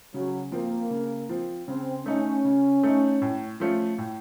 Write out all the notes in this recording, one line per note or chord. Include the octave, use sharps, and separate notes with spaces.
C#3 F#3
F3 A#3 C4
C#3
F3 C4
C#3 C4
A3 C#4 D#4
C#3
A3 D#4
A2
F3 A3 C#4 F4
A2